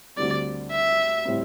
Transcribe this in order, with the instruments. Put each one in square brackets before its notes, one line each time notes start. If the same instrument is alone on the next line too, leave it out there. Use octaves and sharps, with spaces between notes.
[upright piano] D2 D3 G3 C4 [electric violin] D5
[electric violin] E5
[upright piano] A2 G3 C4